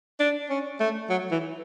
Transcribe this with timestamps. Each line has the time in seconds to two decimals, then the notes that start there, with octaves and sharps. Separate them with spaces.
0.20 D4
0.50 C#4
0.80 A3
1.10 F#3
1.32 E3